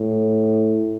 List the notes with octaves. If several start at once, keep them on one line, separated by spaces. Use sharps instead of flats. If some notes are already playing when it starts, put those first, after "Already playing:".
Already playing: A2